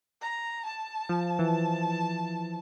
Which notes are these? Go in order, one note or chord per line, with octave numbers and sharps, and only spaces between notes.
A#5
A5
F3
E3